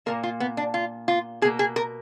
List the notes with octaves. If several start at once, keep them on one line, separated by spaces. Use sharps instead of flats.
A#2 F3 A#3 A#4
F4
B3
D4
F4
F4
B2 A#3 G#4
G#4
A#4